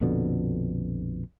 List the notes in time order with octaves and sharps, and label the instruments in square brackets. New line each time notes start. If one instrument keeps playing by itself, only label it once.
[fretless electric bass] A#1 F2 B2 D3